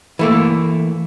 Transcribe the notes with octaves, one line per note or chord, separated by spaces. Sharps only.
E3 A3 A#3